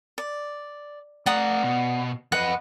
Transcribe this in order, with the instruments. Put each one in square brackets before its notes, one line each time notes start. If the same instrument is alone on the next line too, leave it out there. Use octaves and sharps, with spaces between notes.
[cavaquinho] D5
[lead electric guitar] A3 A#5 [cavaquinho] D5 F#5 D#6
[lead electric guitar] B2
[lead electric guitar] F2 D#5 [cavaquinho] B4 F#5